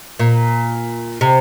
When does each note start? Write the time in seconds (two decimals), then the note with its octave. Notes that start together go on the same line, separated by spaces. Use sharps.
0.19 A#2
1.21 C3